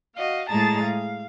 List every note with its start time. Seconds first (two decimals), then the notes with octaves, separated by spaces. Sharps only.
0.16 F#4 D#5 F5
0.49 A2 G#3 G#4 A5 A#5 A6
0.83 F5